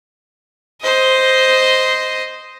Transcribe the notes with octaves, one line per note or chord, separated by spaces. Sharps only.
C5 D#5